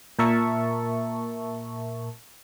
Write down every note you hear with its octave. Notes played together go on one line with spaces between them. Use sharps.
A#2 A#4 E5 A5 C#6